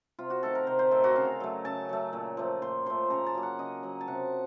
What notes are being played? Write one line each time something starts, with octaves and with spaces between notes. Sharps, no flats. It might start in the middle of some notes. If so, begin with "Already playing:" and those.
C3 F4
F#4
D#3 A3 C4 A4
A#4
C3 C5
C5
D#3 A3 C4 A4
F#4
C#3 F5
F#3 A3
C#3 A5
F#3 A3
A#2
F3 A3
A#2 C6
F3 A3 C6
C#3 A#5
A5
F#3 A#3
F#5
C#3 D#5
F#3 A#3
A5
C3 F#5